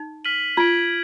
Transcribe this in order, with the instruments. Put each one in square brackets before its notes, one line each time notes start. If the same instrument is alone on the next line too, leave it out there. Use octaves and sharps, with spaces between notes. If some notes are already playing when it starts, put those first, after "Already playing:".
Already playing: [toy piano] D#4
[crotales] F6 B6 D#7 F#7
[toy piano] F4 [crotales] F6 G#6 B6 D7 F#7